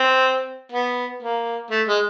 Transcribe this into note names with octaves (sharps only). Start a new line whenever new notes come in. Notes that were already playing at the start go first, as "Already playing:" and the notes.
Already playing: C4
B3
A#3
A3
G#3